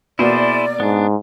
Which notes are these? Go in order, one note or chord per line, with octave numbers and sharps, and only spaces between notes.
B2 A#3 E4 F#4 G#4 C5 D5
G#2 B3 D4